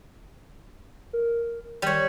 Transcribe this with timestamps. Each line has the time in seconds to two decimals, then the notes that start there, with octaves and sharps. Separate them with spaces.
1.13 A#4
1.82 D#3 G3 C#5